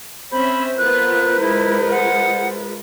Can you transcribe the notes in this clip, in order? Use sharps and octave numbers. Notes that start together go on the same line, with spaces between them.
C4 C#4 C5 E5 B5
B3 F4 A#4 B4 F#6
G#3 E4 F4
F#5